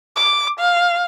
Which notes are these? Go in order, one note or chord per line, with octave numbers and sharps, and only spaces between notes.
D6
F5